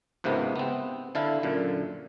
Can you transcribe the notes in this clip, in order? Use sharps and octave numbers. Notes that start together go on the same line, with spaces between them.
C#2 G#2 C3 A#3 B3
B3 C4
D3 E4 A4 F5
F#2 A#2 D3